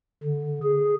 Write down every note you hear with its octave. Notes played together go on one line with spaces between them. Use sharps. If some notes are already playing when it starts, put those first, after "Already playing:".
D3
G#4